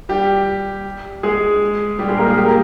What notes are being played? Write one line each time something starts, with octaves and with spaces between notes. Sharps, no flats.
G3 G4
G#3 G#4
G3 G4
G#3 G#4
A#3 A#4
G#3 G#4
G3 G4
A#3 A#4